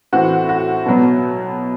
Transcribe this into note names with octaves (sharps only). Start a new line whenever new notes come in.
A2 E3 A3 C4 F#4
F#4
B2 F#3 B3